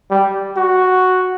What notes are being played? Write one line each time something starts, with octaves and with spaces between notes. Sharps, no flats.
G3
F#4